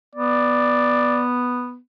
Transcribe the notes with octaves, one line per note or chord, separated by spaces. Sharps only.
B3 D5